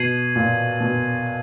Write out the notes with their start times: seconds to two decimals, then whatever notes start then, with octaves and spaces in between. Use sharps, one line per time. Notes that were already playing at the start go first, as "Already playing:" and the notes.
Already playing: B2 G#6 C7 D#7 F#7
0.36 A#2
0.81 B2